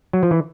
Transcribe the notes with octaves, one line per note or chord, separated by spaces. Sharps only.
F#3
F3
E3